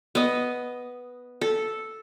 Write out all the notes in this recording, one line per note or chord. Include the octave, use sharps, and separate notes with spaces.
B3 D#5
A4